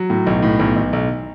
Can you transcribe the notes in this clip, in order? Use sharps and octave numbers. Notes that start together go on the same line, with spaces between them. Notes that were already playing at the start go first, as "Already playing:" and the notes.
Already playing: F#3
A2
B1
A2
B1
B1
B1